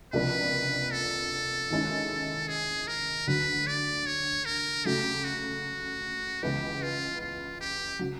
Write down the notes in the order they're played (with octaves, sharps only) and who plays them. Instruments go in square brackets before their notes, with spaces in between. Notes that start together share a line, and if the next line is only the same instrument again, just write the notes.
[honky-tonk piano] C#2 C3 F3 A#3 D4 [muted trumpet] B4
[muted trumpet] A4
[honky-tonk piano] D#2 D#3 G#3 C#4 E4
[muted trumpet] G#4
A#4
[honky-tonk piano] D2 D3 F#3 [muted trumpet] B4
[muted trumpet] D5
C#5
A#4
[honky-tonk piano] C#3 F#3 A3 [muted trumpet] G4
[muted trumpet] F#4
[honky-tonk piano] C#2 C#3 E3 G#3 B3 [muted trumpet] G4
[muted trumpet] F4
F4
G4
[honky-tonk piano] C#3 F#3